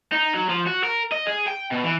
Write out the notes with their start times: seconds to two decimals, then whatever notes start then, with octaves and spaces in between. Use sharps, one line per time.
0.12 D#4
0.34 F#3
0.50 F3
0.67 F#4
0.84 A#4
1.12 D#5
1.27 G#4
1.48 G5
1.72 B2
1.84 E3